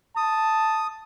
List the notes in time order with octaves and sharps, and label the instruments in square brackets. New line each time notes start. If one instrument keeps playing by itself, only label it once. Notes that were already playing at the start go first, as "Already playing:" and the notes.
[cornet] A5 [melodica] D#6